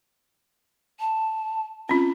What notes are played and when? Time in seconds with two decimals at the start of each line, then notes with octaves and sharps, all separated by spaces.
1.00 A5
1.89 C4 C#4 F4